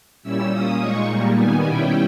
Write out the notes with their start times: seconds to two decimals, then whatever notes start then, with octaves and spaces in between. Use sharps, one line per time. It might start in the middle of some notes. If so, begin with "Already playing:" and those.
0.23 A#2 G3 C#4 E4 E6
0.52 A#2 A#3 C#4 D#6
0.80 A#2 G#3 D#4 C#6
1.09 A#2 G3 A#3
1.37 D#3 G3 B3 G#5
1.66 B2 G3 C#4 E4 G5